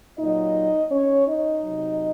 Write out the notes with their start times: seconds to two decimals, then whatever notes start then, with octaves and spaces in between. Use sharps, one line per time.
0.19 A#2 F#3 D#4 D#5
0.91 C#4 C#5
1.27 D#4 D#5
1.64 C3 F#3